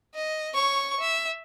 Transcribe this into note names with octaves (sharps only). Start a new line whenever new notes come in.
D#5
C#5 C#6
E5